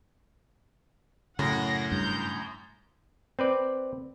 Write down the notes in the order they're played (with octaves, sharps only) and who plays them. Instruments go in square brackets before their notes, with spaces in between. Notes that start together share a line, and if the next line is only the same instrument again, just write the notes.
[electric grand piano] F#2 A2 [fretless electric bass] C#3 [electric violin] F#5 A#6
[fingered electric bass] G2 [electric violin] A#5 G6
[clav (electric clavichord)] C4 B4 D5